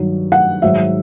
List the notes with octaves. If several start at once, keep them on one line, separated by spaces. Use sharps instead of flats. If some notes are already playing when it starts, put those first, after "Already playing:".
Already playing: G2 D#3 F#3
F#5
G#2 D#3 F#3 E5